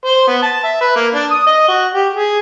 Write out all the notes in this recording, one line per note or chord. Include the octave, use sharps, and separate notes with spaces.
C5
B3
A5
E5
B4
A#3
D4
D#6
D#5
F#4
G4
G#4